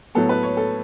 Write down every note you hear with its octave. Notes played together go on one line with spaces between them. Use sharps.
A2 F#3 B3 A4
B4
C#5
A4